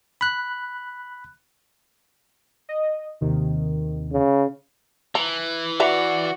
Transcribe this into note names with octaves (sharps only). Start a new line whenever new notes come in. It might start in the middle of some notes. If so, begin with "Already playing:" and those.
B5 F#6
D#5
D#2 C3 D#3
C#3
E3 A#5
F#4 B4 D5 E5 A#5